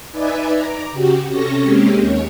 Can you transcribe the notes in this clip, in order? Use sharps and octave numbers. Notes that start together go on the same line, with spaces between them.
D#4 B4 D5 E5 G#5
A#5 D6
C#3 F#4 G4
C3 C#4 A4 C#6 A#6
G#3 A#3 C4 C#4 G4
D#2 C#5